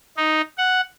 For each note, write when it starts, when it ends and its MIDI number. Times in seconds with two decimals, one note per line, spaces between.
0.17 0.42 63
0.58 0.81 78